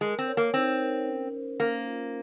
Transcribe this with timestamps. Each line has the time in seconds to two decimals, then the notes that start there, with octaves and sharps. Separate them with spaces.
0.01 G#3 A#4
0.19 C4
0.28 C#5
0.37 A#3
0.54 C4 D#4
0.81 A#4
1.06 C#4
1.33 C5
1.60 A#3 C#4
1.86 F4